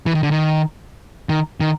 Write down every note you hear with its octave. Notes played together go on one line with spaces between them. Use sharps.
E3
D#3
D3
D#3
D#3
D#3